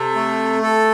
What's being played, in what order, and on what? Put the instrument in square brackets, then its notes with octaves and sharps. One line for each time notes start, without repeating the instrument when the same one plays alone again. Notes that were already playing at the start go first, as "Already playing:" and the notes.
Already playing: [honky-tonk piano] C3 [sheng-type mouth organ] A4
[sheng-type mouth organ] A3
A4